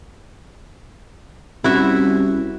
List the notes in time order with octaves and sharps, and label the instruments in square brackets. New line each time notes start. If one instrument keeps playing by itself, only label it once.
[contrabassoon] C2 [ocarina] C#4 [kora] E4 F#4 E5